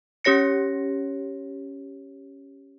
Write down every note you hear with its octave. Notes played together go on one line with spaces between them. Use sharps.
C#4 G4 C#5 A#6 C#7